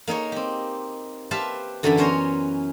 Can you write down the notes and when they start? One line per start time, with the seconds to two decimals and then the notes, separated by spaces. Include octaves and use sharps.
0.07 A#3 D#4 G#4 C#5
0.32 C4 G4
1.31 G4 B4 C5 E5 F5 A5
1.83 F#2 D3 E3 D4 A4 B5
1.97 B3 C#4 C5 C#5 A#5 C6